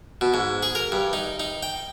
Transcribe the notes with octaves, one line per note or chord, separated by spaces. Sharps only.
B2
G#2
G#4
A#4
G2
D#4
D#4
G5